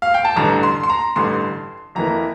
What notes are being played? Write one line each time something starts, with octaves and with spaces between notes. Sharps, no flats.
F5
G5
A5
A1 G2 D3 A#5
C6
C6
A#5
A1 G2 D3 C6
F2 E3 A#3 A#5